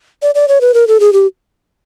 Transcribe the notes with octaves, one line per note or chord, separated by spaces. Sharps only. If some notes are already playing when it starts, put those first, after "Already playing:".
D5
D5
C#5
B4
A#4
A4
G#4
G4